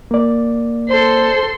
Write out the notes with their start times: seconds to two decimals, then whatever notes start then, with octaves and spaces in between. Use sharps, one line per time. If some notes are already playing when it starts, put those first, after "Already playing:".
0.11 A#3 D5
0.89 A4 C5 C6